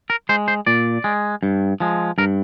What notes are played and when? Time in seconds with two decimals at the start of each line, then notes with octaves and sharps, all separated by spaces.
0.10 A#4
0.29 G#3 C5
0.48 C5
0.67 A#2 D5
1.04 G#3
1.43 G2
1.80 F3 G#3
2.18 G2 A#4